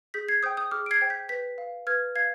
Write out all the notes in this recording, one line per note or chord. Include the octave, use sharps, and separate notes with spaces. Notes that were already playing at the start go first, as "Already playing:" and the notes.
G#4 G6 B6
G#6 C7
C5 G5 D#6 G6
D#6 G6
G#4 D6 F6
D7
G#6 C7
C5 G5 G#6
G6 B6
B4 G6 B6
F5
B4 F6 G#6
F5 G#6 C7